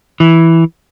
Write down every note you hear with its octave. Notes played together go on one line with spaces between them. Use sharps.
E3